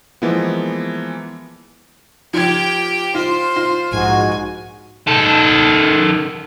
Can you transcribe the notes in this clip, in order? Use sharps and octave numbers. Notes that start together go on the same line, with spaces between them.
E3 F3 G#3 A#3 B3
F3 G4 G5 G#6
F4 C5
F4
A#1 G#2 F#4 G#5
D#3 A4